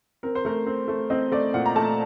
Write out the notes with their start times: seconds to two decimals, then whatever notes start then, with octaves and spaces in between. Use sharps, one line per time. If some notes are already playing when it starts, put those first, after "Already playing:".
0.23 C4 A#4
0.35 C5
0.45 A3 A#4
0.67 C4
0.88 A3
1.10 C4 D#5
1.32 A3 D5
1.54 A#2 F#5
1.66 A#5
1.76 A3 A5